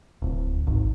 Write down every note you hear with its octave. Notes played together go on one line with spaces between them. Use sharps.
D1
G#1